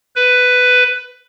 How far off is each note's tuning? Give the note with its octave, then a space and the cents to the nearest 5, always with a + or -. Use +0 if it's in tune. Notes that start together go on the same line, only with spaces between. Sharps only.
B4 +10